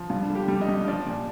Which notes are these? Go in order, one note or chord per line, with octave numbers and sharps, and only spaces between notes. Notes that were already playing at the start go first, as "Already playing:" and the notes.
Already playing: F3
G2 F4
D3
G4
G3
D#5
G2
F3 D5
A#2